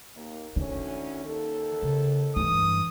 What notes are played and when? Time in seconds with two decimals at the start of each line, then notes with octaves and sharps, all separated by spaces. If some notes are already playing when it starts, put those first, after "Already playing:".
0.15 D#2 A#3
0.56 D2 D#3 C#4
1.24 D#2 A4
1.82 C#3
2.36 G2 E3 D#6